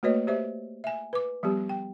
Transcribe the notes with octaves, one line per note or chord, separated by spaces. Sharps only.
A3 A#3 F#4 B4 C#5 D#5
G4 C5 D5 E5
E5 G#5
B4 D6
F3 G3 B3 G4
G5